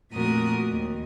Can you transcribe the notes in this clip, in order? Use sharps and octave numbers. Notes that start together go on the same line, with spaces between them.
F2 A#2 A3 F#4 A#4 D#6
D#2